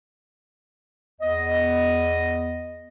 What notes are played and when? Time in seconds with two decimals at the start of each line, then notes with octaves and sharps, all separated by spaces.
1.20 E2 B3 D#5